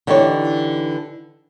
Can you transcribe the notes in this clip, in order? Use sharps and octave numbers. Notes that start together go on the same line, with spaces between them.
D3 E3 D#4 G4 A#4 C#5